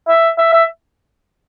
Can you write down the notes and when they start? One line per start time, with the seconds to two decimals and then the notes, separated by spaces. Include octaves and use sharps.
0.09 E5
0.38 E5
0.53 E5